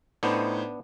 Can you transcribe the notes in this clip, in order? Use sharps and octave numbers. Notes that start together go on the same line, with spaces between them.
A2 B3 D4 D#4 C5